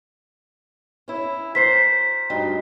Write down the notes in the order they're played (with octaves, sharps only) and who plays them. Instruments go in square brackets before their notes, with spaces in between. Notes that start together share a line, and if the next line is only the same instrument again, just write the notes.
[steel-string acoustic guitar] C#4 E4
[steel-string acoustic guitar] A#4 C5 [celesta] B6 C7
[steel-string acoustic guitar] D2 G2 D#4